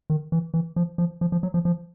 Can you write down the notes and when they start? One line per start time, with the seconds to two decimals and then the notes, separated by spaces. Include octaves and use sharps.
0.10 D#3
0.32 E3
0.54 E3
0.76 F3
0.98 F3
1.21 F3
1.32 F3
1.43 F#3
1.54 F3
1.65 F3